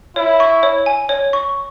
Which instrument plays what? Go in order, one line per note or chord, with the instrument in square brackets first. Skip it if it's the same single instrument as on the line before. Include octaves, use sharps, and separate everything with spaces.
[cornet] E4 [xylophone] C#5
[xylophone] C#6
C#5
G#5
C#5
C#6